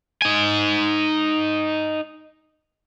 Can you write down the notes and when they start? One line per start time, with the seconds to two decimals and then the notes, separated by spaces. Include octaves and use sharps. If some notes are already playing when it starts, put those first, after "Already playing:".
0.22 D#4 G#5